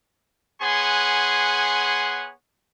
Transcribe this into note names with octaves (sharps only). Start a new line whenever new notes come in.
B3 G#4 C#5 F#5 G#5 C6